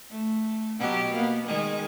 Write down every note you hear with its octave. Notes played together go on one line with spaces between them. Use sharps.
A3
B2 F#3 G4
A#3 B3
D#3 G#3 G#4